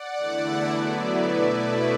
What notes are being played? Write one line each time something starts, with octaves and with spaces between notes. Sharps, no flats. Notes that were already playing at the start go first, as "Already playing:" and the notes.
Already playing: D5 F#5
E2 D3 A3 E4
D3 F#3 B3 E4 B4 D5
B2 A3 E4